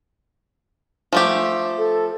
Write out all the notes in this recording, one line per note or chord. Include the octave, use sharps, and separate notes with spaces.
F3 A3 G4
A4